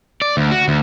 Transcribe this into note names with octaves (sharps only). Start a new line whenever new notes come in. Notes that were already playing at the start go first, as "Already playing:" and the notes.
D5
D2
F#4
D2